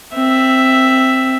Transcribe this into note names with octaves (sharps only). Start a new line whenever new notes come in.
C4 E5